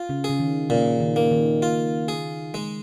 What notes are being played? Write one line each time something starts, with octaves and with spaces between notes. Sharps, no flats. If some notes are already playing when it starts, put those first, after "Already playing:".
Already playing: F4
C#3
G#4
C#3
D#3
A#2 C#3
D#3
A#3
D#3
F4
G#4
G#3